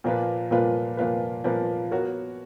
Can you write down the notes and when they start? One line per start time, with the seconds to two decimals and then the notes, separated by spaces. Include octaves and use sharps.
0.04 A#2 F3 A#3 F4 B4
0.51 A#2 F3 A#3 F4 B4
0.97 A#2 F3 A#3 F4 B4
1.44 A#2 F3 A#3 F4 B4
1.91 B3 F#4 A#4 C#5